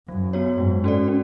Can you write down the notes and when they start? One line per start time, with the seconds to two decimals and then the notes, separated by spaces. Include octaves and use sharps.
0.08 F#2 F#3
0.33 B3 F#4 C#5
0.58 G#2 G#3
0.84 C#4 F#4 A4 D5
1.08 C#4